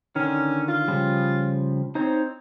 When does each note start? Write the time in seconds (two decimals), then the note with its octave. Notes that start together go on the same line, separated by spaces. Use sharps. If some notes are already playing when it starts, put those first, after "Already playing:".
0.16 D3 D#3 C#4
0.68 F4
0.88 C#3 F3 G3
1.95 C4 D#4 C5 C#5